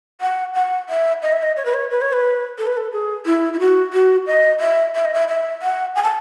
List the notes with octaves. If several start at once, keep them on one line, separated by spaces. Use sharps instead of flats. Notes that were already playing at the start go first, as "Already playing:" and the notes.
F#5
F#5
E5
D#5
E5
D#5
C#5
B4
C#5
B4
C#5
B4
A4
B4
A4
G#4
E4
E4
F#4
F#4
D#5
E5
E5
D#5
E5
E5
F#5
G#5
A5